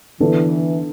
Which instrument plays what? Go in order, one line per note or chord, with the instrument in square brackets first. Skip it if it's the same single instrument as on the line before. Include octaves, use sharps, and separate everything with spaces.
[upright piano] D3 B3 D4 A4 [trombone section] E3